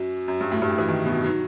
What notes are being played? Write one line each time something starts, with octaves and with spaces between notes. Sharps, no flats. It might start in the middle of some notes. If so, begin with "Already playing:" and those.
Already playing: F#2 F#4
F#2
G2
A2
G2
A2
E3
D#3
B2
F#3 D#4